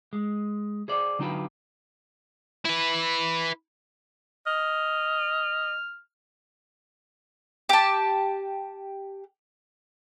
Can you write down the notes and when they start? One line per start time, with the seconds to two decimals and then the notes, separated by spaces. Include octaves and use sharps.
0.13 G#3
0.88 G#4 C5 D5
1.19 D3 F#3 D#4 F4 G4 B4
2.65 E4 B4
4.47 D#5 F6
7.69 G4 A5